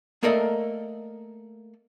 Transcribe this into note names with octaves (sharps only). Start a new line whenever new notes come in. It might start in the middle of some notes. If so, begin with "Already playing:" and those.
A3 A#3 A4 A#4 D5 D#5